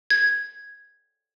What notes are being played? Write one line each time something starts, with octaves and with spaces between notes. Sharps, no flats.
G#6